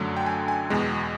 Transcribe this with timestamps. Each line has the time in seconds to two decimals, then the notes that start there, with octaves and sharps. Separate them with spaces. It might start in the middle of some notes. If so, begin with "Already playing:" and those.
Already playing: F#2 D3 F#3 A3
0.16 G5
0.26 G#5
0.48 G#5
0.70 E2 B2 G#3